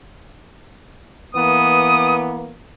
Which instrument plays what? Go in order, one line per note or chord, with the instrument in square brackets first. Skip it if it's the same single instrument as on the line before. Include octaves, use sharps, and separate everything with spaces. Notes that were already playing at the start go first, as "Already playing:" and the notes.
[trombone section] E3 A#3 B3 [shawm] D#6